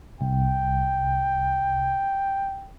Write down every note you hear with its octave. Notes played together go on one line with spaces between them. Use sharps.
C2 G5